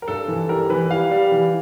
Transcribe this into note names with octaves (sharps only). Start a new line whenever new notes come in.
A#4
G2 A4
E3
G3 A#4
E3 B4
G3 F5
G3
E3